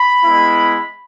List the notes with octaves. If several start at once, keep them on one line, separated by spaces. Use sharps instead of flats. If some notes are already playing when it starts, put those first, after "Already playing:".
Already playing: B5
G#3 B3 E4